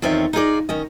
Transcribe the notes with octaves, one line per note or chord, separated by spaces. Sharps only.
E2 D#3 C4 F4 C#5 E5
D#4 F4 G#4 D5
D#3 C#4 D#5